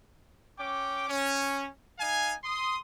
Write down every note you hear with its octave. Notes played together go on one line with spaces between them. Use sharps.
C#4 G5 D6
C#4
D#4 F5 G#5
C6 D#6